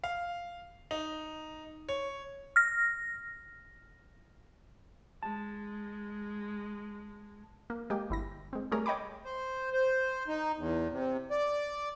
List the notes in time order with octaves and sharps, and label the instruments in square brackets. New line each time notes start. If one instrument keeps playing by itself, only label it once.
[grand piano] F5
D#4
C#5
[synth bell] F6 A#6
[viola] G#3 [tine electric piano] A5
[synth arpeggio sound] A#3
G#3 A#3 G4
G1 E4 A#6
G#3 C4
G3 A3 G#4 A#4 C#5
C#5 D#5 G5 B5 D6
[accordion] C5
C5
D#4
E2
C3
D5